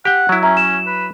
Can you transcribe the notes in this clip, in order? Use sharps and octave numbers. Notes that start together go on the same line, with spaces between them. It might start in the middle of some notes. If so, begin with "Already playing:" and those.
G4 F#5 G5
F#3 E4
C#4 E5 A#5
E7
B4